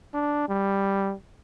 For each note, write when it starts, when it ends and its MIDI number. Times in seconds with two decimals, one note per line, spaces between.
0.14 0.47 62
0.48 1.13 55